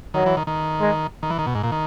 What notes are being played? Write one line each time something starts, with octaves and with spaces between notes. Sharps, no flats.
D#3 F#3
E3
D#3
D#3
G#3
D#3
E3
D#3
B2
G#2
A#2
D#3